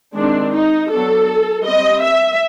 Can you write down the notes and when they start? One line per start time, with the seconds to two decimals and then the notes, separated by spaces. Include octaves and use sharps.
0.15 D#3 G#3 C4 D4
0.53 D#4
0.90 F#3 B3 D4 A4
1.65 G3 C4 D#5
2.02 E5